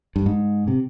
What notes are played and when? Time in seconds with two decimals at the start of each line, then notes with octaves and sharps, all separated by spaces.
0.16 G2
0.26 G#2
0.68 C3